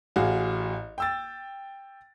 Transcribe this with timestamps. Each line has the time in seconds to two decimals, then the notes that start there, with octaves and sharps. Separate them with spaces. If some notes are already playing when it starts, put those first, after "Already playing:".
0.16 A1 F#4 G#4 F5
0.98 G5 E6 A6